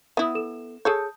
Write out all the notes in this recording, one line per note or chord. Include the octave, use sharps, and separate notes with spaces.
B3 E4 E5 D#6
A4 E7
G#4 A4 C#5 A5 D#6 G6